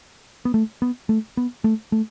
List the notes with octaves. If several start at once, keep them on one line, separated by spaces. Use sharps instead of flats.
B3
A3
B3
A3
B3
A3
A3